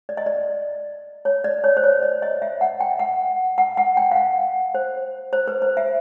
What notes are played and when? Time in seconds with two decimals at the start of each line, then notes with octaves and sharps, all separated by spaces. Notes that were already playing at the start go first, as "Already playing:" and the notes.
0.09 D5
0.17 D#5
0.26 D5
1.25 C#5
1.44 D5
1.64 C#5
1.77 C5
1.84 C#5
2.03 D5
2.22 D#5
2.42 E5
2.61 F#5
2.81 G5
2.99 F#5
3.58 F#5
3.77 F#5
3.97 G5
4.12 F5
4.16 F#5
4.75 C5
5.33 C5
5.48 B4
5.62 C5
5.77 E5